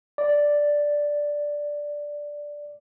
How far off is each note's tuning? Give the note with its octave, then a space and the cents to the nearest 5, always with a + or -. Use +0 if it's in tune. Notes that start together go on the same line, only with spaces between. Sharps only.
D5 +0